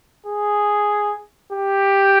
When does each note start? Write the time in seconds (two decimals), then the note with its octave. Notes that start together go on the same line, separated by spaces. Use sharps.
0.27 G#4
1.53 G4